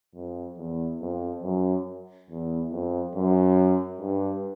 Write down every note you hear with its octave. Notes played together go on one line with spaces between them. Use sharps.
F2
E2
F2
F#2
E2
F2
F#2
G2